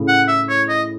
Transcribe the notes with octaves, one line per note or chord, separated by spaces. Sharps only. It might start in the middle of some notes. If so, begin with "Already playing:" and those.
Already playing: A2 C#3
F#5
E5
C#5
D#5